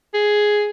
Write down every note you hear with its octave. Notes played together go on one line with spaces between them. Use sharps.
G#4